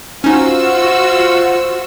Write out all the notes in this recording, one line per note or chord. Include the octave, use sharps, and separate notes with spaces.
C#4 D#4 F4 F#4 C5 E6